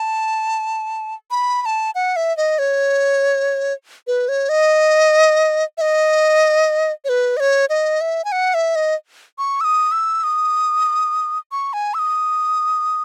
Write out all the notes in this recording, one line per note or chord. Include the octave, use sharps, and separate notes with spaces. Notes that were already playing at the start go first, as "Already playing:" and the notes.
Already playing: A5
B5
B5
A5
F#5
E5
D#5
C#5
B4
C#5
D#5
E5
D#5
C#5
B4
D#5
C#5
D#5
E5
G#5
F#5
E5
D#5
C#6
E6
D#6
E6
D#6
C#6
G#5
E6
D#6